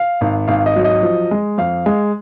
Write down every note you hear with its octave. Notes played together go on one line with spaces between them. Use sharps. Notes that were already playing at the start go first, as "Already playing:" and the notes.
Already playing: F5
G#1
G#1 F5
D#5
F#3
D#5
F3
G#3
F2 F5
G#3